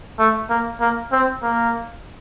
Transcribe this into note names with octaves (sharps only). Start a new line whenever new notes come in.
A3
A#3
A#3
C4
A#3